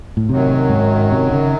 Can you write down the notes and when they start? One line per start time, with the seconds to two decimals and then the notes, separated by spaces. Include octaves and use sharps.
0.17 A2
0.28 F#2 C3 D#3 F#3
0.69 G#2
1.11 C3
1.32 C#3